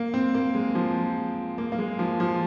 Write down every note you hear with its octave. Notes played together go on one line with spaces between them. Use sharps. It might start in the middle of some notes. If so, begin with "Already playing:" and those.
Already playing: A#3
C4
A#3
G#3
F3
A#3
A#3
G#3
F3
F3